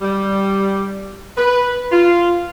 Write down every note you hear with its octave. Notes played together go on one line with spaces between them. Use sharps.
G3
B4
F4